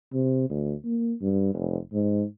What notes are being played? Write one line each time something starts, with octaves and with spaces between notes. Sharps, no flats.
C3
D2
A#3
G2
F1
G#2